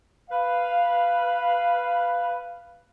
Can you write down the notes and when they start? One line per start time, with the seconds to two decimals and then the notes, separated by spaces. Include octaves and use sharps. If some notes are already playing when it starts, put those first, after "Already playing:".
0.31 B4 F5